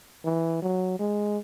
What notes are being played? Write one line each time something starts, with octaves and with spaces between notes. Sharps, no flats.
E3
F#3
G#3